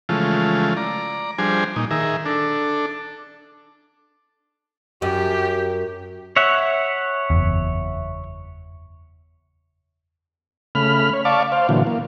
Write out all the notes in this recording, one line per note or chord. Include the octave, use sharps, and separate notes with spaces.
C#3 E3 F3 G#3 A3 F4
D5 A#5
F3 G3 D4 G#4 C5 G#5
A#2 D#4
D#3 G#4 A#4 E5
D4 A4
F#2 G4
C#5 E5 F#5
F#1 E2
C#3 A3 B5 F6
C#5
D5 F5 A5 C#6 D6
C5 F5
A#2 D3 E3 F#3
A#3